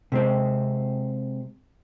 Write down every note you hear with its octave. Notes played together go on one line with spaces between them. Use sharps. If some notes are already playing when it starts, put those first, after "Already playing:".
C3 G#3 C4